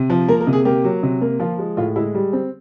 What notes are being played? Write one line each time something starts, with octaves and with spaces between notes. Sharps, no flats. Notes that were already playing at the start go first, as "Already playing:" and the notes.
Already playing: C3
F3
A#3 A#4
A#4
C3
G#4
A#3 G4
F#3
C3
A#3
F3 F4
G#3
A2 F4
G#3 E4
G3
C4